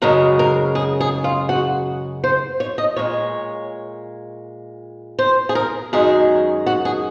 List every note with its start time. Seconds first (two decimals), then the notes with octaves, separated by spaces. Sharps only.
0.02 F#2 C#3 G#3 A#4
0.39 A#4
0.75 G#4
1.01 G#4
1.24 F4
1.49 F#4
2.24 C5
2.60 C#5
2.78 D#5
2.96 A#2 G#3 C#5
5.19 C5
5.49 G#4
5.55 A#4
5.93 F#2 D#3 G#3 G#4
6.66 F#4
6.85 G#4